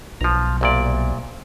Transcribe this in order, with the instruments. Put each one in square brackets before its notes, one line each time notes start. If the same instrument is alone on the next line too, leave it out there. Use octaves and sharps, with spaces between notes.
[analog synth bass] B1 [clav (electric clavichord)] F3 A#5
[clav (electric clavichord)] C2 A#2 D5